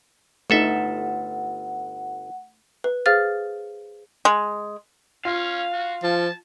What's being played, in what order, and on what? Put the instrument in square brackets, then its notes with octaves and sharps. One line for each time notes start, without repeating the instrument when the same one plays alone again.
[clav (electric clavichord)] G1 A4 E5 [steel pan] A3 D#4 [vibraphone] F#5
[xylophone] B4
G#4 C5 F5 F6 A6
[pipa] G#3
[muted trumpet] C#4 [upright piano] F4 [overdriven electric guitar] F5
[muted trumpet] F#4
[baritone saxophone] F3 [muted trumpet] A5